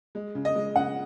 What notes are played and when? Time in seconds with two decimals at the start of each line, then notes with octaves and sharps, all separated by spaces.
0.15 G#3
0.35 C#3
0.45 D#5
0.55 G#3
0.76 C#3 F#5